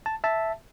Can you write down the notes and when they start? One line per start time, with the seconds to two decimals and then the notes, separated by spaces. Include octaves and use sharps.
0.06 A5
0.24 E5 A5